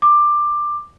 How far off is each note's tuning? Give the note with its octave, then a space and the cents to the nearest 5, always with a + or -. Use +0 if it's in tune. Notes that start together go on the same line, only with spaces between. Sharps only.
D6 +15